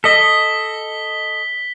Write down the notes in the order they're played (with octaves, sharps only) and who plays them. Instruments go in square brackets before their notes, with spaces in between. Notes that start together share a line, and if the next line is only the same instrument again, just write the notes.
[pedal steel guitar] A4 D#5 [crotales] B6 G7